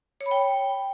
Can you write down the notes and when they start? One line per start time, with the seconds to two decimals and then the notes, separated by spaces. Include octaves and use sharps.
0.21 C#5
0.26 B5
0.31 G5